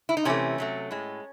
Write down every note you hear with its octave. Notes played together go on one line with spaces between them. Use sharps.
E4
D#4
C3 E3 A3 C#4
C3 F#3 A3
A2 G#3